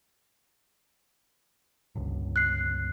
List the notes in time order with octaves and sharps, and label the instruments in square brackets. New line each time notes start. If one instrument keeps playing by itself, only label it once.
[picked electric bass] G1 C#2
[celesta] F#6 C7